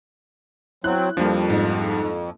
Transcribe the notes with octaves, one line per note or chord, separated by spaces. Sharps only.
F#3 C4 E4 F#6
F2 F3 G3 A#3 D4
G#2